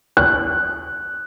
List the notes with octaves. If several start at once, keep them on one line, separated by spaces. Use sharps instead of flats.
F#6